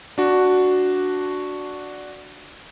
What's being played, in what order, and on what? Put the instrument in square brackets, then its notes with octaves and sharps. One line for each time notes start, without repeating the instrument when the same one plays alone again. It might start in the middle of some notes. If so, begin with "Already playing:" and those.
[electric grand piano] D4 F#4